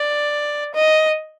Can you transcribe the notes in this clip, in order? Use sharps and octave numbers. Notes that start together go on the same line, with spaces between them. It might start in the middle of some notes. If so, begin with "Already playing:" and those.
Already playing: D5
D#5